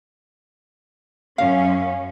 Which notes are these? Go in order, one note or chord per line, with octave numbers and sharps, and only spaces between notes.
F#2 C#4 F5